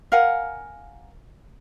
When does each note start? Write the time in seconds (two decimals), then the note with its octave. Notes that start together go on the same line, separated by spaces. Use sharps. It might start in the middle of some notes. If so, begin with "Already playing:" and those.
0.12 A#4 F5 F#5 G#5